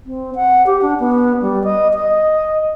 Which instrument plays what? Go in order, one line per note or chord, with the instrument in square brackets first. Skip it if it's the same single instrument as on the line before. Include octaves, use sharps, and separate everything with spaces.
[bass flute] C4
F#5
G4
D4
B3
G3
D#5
D#5